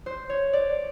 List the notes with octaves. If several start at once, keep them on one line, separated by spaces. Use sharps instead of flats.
C5
C#5
D5